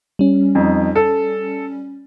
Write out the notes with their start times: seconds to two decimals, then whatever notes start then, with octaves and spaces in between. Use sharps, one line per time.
0.19 G3 C#4
0.55 F2 D#4
0.96 A4